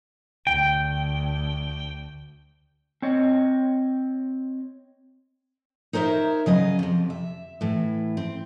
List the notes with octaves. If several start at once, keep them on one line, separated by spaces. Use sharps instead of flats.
D2 G5
C4 C#5 D#5
D#4 A#4 C5 C#5 E5
C#3 F#3 D#5 F5
F2 C3
E5
A2 E3
C4